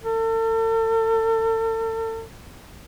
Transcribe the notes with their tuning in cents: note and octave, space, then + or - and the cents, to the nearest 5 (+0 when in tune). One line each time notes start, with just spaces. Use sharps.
A4 +40